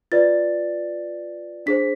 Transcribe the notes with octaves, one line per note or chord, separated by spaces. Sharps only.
F4 B4 D5 A6
D4 G#4 C5 B6